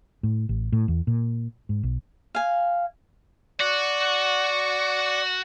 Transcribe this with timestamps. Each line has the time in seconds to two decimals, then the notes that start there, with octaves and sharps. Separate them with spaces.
0.23 A2
0.49 A1
0.72 A2
0.88 E2
1.07 A#2
1.69 G#2
1.83 B1
2.35 F5 G#5
3.60 F#4 D5 C#6